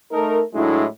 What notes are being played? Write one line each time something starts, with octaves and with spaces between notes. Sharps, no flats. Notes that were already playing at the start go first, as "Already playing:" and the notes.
A3 D#4 A4 A#4
A2 F#3 G#3 A3 D4 E4